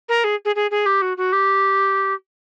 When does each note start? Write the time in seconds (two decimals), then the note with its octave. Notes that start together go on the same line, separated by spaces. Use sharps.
0.09 A#4
0.24 G#4
0.45 G#4
0.55 G#4
0.71 G#4
0.86 G4
1.02 F#4
1.17 F#4
1.32 G4